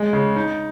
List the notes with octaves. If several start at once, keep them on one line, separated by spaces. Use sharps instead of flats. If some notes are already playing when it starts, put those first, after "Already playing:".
Already playing: G#3
C#3
D#4